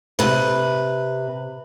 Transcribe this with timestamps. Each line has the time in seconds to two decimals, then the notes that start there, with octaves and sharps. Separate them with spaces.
0.19 C3 B4